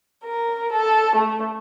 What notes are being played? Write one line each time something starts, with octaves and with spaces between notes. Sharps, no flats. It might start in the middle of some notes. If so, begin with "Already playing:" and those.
A#4
A4
A3